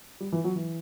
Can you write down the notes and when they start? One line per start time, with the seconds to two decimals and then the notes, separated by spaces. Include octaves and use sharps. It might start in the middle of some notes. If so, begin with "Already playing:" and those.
0.20 G3
0.32 E3
0.44 F#3
0.56 E3